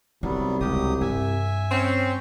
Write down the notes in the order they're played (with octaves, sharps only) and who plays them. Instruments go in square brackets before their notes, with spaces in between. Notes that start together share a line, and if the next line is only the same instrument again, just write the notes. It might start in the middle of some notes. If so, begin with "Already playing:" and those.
[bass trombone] C2 [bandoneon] F#3 G3 B3 [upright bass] D#4
[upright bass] C#2 C#3 [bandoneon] F#3 G4 D#6
[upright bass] G2 [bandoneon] E5 G#5
[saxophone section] C4 C#4